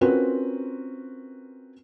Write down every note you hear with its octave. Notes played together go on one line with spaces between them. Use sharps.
C4 C#4 F4 F#4 A#4 B4